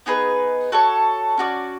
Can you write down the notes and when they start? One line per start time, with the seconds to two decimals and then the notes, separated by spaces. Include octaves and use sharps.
0.06 B3 D#4 G#4 B4
0.72 F#4 A4 C#5
1.38 C#4 F#4 A#4 D5